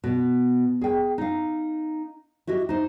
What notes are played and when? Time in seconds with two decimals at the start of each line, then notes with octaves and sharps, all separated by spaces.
0.04 B2
0.81 G#4 G5
1.18 D#4 F5
2.47 E4 F#4 G4 D#5
2.69 D#4 C5